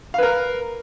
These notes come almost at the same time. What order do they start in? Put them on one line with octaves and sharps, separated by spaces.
F5 B4 A#4